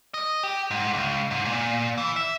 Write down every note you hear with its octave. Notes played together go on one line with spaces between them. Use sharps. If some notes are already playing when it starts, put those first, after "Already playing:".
D#5
G4
G#2
C#2
G#2
A#2
E3
E5